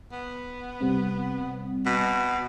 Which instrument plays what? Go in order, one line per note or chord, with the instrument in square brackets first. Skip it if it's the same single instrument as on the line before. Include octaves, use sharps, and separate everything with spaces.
[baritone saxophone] B3
[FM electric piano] C3 G3 C4
[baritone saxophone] B2